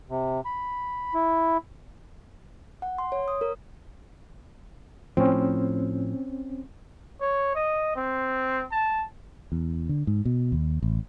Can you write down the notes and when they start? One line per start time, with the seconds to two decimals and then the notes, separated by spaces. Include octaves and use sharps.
0.10 C3
0.45 B5
1.14 E4
2.82 F#5
2.98 C6
3.12 C#5
3.28 D#6
3.41 A#4
5.17 A2 F3 C4 C#4
7.20 C#5
7.55 D#5
7.96 C4
8.72 A5
9.52 E2
9.89 D3
10.07 G#2
10.25 B2
10.52 D#2
10.83 A1